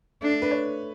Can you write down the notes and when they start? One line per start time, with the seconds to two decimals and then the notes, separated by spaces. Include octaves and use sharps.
0.22 A3 D4
0.42 B4
0.51 C#5